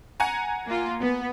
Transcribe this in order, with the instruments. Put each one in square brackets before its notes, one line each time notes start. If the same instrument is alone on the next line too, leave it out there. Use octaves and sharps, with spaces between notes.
[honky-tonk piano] F#5 G#5 A#5
[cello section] A#3 F4
B3